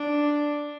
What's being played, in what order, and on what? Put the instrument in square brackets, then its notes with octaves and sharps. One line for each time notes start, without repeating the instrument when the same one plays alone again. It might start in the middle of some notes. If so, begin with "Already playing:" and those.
Already playing: [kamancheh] D4